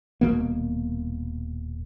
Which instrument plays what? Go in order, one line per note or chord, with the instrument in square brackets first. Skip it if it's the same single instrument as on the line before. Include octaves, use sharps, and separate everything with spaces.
[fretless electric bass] D#1 B2 A#3